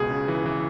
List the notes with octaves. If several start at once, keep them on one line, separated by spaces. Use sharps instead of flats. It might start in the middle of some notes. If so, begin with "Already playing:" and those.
Already playing: C#2 B2 G#4
C#3
E3
E3